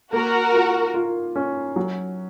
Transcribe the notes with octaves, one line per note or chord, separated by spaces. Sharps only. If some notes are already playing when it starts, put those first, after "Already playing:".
A#3 F#4 A#4
F4
F4
C#4
F#3